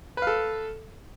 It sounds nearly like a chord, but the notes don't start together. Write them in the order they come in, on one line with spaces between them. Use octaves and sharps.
B4 F5 A4